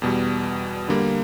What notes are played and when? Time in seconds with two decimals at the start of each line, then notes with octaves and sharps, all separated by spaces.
0.02 E2 B2 G3
0.89 D3 G3 A#3